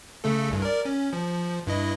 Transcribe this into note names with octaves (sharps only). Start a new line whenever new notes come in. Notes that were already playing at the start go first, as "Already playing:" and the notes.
C#3 A3 A4
C2 G2
A#4 D5
C#4
F3
G2 E4 D#5